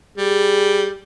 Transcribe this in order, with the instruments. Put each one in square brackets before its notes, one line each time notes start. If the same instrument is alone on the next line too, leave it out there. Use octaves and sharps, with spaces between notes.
[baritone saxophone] G3 [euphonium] G#4